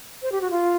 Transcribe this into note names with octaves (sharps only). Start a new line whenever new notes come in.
C5
G4
F#4
F4